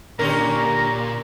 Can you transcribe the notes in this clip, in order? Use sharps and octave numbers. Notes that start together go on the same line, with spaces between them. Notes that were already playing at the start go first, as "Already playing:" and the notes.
A#2 D3 C#4 G4 A#4 A#5